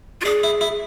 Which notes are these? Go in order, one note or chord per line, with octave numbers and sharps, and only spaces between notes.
F4
D4 G#4
E4
E4